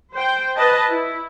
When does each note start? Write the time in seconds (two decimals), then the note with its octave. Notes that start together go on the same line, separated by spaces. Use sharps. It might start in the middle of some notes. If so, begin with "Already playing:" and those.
0.14 C5 G5
0.56 B4 D#5 A5
0.90 E4